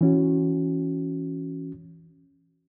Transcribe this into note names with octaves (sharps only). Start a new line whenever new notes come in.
E3 C#4 F#4